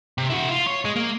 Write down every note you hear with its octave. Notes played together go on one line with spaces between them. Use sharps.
C3
E4 F#4
F4
C#5
G#3
A#3